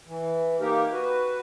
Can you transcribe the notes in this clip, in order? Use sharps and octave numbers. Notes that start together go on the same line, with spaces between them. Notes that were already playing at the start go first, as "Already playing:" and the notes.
E3
A#3 D#4 G4 A#4
F#4 B4